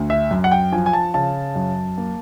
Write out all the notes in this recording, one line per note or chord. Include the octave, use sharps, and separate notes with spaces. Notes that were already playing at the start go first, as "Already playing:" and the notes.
Already playing: D2
E5
F#2
F#5
G5
F3 G#5
G#5
A5
C#3 A5
F#2
A#3